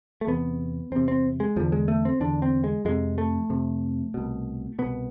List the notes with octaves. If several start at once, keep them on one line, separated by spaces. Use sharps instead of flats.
A3
E2 C3 B3
E2 C3 C4
C4
G#3
E2 D3 F3
G#3
A3
C4
E2 D3 D4
C4
G#3
F2 C3 G#3
A3
F2 C3
C2 B2
C2 B2 B3